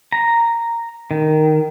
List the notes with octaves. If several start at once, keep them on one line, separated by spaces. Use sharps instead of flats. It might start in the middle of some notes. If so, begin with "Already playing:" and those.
A#5
D#3